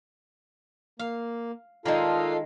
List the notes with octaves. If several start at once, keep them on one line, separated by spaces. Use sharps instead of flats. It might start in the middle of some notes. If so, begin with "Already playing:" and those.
A#3 F5
D#3 G#3 A#3 D4 D#4 F4 A4 F5